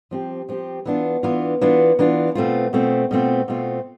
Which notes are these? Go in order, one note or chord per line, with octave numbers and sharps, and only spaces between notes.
F3 C4 G4
F3 C4 G4
E3 B3 D4 F4
E3 B3 D4 F4
E3 B3 D4 F4
E3 B3 D4 F4
B2 A3 C4 F4
B2 A3 C4 F4
B2 A3 C4 F4
B2 A3 C4 F4